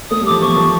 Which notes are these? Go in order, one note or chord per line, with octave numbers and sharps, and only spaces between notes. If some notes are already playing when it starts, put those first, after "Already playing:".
A3 D#6
G3
F3 D6
F3 C#6
F3